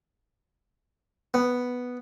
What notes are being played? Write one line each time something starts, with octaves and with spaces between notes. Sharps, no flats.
B3